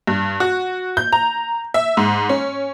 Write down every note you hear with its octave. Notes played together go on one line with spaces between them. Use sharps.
G2
F#4
G6
A#5
E5
G#2
C#4